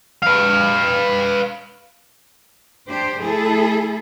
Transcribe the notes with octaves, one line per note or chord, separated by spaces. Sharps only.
B4 F5
D4 G4 C5
A3 E4 G#4 A4